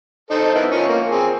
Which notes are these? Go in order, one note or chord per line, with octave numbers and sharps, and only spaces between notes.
D#4 A4 C5
B3 E4 A#4
F3 C#4 C#5
A#3
C4 G#4